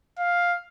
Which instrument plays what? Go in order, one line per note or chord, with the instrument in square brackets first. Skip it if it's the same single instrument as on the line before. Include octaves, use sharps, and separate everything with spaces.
[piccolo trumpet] F5